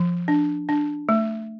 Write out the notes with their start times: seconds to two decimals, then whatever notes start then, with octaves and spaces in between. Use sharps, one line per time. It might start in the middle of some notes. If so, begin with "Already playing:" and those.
Already playing: F3
0.28 D4
0.69 D4
1.09 A3